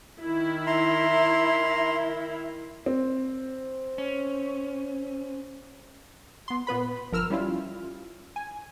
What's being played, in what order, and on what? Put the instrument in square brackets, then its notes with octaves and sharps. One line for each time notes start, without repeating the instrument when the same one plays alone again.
[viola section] D#3 E4
[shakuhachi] E5 [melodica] A#5 C6
[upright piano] C4
[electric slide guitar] C#4
[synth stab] B3 C6
A#2 B3 B4 B5
G1 F3 A#4 E6 F6
G3 C#4 E4 F4
G#5